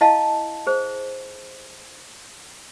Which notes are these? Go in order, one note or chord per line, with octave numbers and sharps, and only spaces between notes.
E4 D#5 F5 A5
G#4 C5